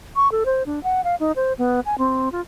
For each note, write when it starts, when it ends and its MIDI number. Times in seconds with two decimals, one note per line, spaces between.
0.16 0.30 85
0.32 0.44 69
0.46 0.63 72
0.66 0.82 62
0.83 1.01 78
1.04 1.15 77
1.20 1.32 63
1.36 1.53 72
1.58 1.80 59
1.86 1.98 80
1.98 2.32 60
2.32 2.41 65